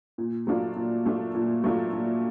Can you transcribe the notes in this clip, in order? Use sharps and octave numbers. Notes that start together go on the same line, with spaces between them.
A#2
F#3 A3 D4 F4
A#2
F#3 A3 D4 F4
A#2
F#3 A3 D4 F4
A#2